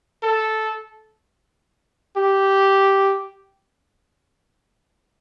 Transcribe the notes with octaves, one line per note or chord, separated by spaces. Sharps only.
A4
G4